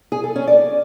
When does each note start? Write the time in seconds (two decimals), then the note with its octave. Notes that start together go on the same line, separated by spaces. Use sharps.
0.12 G#4
0.24 A4
0.36 C#4
0.47 D5